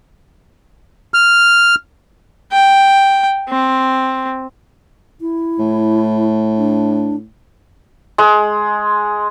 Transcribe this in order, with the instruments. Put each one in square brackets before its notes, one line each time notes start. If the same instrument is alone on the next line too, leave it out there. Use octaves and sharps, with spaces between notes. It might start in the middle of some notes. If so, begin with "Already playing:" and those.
[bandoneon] F6
[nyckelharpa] G5
C4
[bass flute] E4
[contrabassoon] A2
[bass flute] D4
[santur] G#3